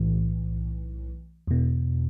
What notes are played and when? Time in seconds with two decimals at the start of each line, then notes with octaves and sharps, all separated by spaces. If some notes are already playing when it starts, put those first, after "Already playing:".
Already playing: B1 A2 E3
1.47 E2 B2